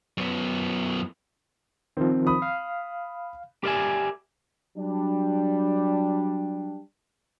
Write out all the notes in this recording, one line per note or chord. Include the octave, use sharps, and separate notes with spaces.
F#2 B3
D#3 F3 C4
B5 D#6
F5
G4 A#4 D5 E5 G#5
F#3 G3 D4